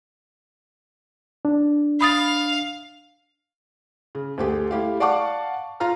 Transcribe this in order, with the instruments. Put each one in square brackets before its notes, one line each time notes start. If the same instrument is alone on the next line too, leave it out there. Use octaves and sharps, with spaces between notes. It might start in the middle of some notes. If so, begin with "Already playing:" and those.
[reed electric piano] D4
[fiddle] F5 [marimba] B5 D#6 A6
[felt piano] C#3
D2 A3 G4 G#4
A3 E4 G4 F5
D5 F5 F#5 A5 C#6 D6
F4 F5 A#5 F6